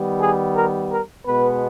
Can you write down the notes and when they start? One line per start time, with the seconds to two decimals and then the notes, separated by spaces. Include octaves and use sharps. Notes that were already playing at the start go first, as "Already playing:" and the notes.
Already playing: D#3 G3 B3
0.21 G#4
0.56 A#4
0.91 A#4
1.25 B2 G#3 B3 B4